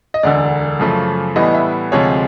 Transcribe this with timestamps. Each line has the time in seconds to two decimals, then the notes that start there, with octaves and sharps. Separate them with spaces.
0.14 D#5
0.23 E1 D2 D3 D5
0.79 F#2 C#3 F3 A3
1.36 A2 E3 G3 B3 D#5
1.54 E5
1.92 D2 C3 F3 G#3 C#5